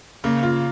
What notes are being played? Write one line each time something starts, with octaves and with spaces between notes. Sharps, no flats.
C#3 A#3
F4